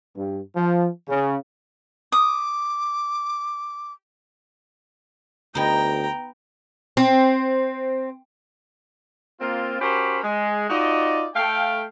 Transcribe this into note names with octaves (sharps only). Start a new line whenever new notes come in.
G2
F3
C#3
D6 D#6
D2 B3 D#4 G5 A#5
C4
A#3 C4 F4
C#4 F#4 G4 A#4 C5 B5
G#3
D#4 F4 F#4 D5 D#5
A3 F5 G5